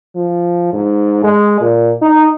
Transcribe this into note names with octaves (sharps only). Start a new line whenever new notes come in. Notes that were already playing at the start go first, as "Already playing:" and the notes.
F3
G#2
G#3
A#2
D#4